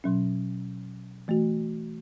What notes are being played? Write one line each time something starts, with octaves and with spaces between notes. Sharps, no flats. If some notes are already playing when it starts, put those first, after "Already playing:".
B2 F#3 C#4
E3 A3 F#4